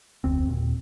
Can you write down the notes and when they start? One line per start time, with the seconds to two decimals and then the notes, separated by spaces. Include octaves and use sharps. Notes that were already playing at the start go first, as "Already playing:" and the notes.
0.24 F1 D2 C4
0.47 D#2 A#2